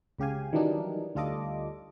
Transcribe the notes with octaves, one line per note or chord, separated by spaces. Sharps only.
C#2 C#3 G4 F5 G#5
D#3 E3 F#3 G3 D4 D#4
D2 G3 F4 A4 D#5 D6